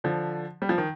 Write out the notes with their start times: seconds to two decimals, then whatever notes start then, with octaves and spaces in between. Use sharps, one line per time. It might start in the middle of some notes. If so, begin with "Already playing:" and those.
0.04 D3 F3
0.62 G3
0.69 F3
0.78 D#3